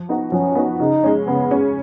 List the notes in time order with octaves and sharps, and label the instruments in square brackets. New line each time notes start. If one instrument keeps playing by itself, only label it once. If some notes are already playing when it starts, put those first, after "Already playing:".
Already playing: [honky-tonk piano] F3
B3 D#4 F#4
[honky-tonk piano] F3 [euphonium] C#4
[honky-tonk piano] B3 D#4 F#4
[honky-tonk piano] C#3 [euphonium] D#4
[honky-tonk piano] G#3 C#4
[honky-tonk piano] C#3 [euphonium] B3
[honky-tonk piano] G#3 C#4